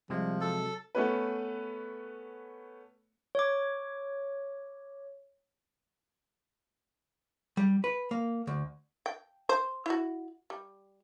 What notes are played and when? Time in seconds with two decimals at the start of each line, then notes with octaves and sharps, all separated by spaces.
0.10 C3 F3 G3 G#3
0.41 F#3 A4
0.95 A3 B3 C#4 B4
3.35 C#5 D6
7.57 G3
7.84 B4
8.11 A#3
8.47 D2
9.06 G5
9.49 C5
9.86 E4 F#4
10.50 G3